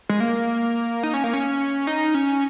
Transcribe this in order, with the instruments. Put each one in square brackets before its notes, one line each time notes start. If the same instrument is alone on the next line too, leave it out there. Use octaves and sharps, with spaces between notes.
[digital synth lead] G#3
A#3
D#4
C#4
A#3
C#4
D#4
C#4